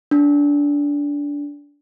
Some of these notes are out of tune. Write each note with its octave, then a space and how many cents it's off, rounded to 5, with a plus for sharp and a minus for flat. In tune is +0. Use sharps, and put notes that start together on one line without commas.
D4 -20